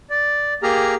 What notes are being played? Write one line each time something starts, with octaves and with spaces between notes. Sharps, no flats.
D5
A#3 G4 G#4 A#5 F6